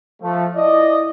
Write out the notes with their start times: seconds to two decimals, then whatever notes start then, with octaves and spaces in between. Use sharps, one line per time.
0.22 F3 A3
0.55 E4 D5 D#5